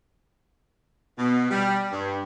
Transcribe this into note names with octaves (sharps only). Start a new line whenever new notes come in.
B2
G3
G2